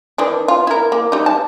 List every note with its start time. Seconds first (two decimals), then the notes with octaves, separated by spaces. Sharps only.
0.18 D#3 E3 D4
0.48 F4
0.67 E4 A#4
0.92 A#3
1.12 G3 D#4
1.26 A5